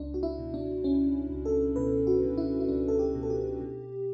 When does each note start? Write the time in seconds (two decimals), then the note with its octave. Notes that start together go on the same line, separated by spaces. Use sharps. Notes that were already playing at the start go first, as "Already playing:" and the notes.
Already playing: C#2 D4
0.14 F#4
0.23 E4
0.38 B2
0.54 D4
0.84 C#2 C#4
1.30 C#2
1.45 A4
1.76 B2 B4
2.07 F#4
2.22 B2
2.38 E4
2.60 E4
2.68 C#2 D4
2.88 A4
2.99 G4
3.15 B2
3.23 A4
3.30 G4
3.61 B2